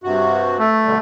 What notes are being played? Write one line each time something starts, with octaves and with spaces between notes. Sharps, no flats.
G2 C3 F#4
A3
B2 D3 G3